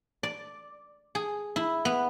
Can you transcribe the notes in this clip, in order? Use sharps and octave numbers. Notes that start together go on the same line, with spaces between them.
D5
G#4
E4
B3